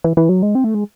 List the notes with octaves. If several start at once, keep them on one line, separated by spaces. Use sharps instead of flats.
E3
E3
F#3
G#3
C4
A3
G#3